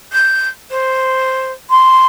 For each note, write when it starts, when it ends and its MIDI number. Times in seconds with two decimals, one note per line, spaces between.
0.12 0.47 91
0.70 1.52 72
1.70 2.06 84